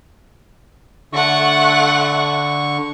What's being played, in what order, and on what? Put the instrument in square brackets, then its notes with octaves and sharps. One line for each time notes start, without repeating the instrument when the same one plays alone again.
[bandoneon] D3 C#6 [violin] A3 F#5